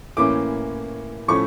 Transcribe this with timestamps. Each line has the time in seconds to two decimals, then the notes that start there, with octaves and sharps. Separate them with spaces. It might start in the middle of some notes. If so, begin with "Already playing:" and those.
0.17 A2 E3 A#3 C#4 D6
1.28 A2 F3 A3 C#4 C#6